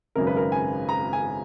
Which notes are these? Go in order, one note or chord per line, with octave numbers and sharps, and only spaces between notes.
G#1 F#2 C#3 A#4
B4
A#4
G#5
A#5
G#5